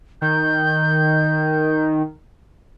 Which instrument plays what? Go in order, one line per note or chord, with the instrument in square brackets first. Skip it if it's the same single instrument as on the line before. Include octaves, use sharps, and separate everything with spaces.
[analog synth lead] D#3 [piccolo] G6